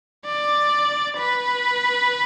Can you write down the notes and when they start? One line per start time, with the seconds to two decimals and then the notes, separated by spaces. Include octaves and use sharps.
0.26 D5
1.18 B4